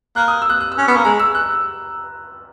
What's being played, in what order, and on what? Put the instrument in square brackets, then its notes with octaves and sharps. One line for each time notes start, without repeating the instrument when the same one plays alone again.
[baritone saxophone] A#3 [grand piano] F#6
[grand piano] D#6
E6
F#6
F#6
E6
[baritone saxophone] C#4
[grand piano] C#6
[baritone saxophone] B3
[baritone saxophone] A#3 [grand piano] C#6
[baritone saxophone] G#3 [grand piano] A#5
[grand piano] E6
F#6